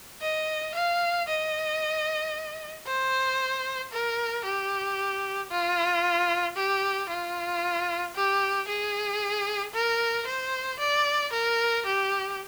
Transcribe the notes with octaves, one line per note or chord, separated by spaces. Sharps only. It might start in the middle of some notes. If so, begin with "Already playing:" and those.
D#5
F5
D#5
C5
A#4
G4
F4
G4
F4
G4
G#4
A#4
C5
D5
A#4
G4